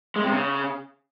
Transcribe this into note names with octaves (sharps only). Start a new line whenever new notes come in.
G#3
C3
C#3